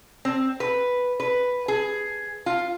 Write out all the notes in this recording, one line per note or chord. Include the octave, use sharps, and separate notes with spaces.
C4
B4
B4
G#4
F4